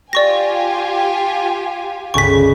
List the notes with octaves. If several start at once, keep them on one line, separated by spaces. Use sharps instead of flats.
F4 G4 D5 G#5 C#6 A#6
G1 C#2 C#6 B6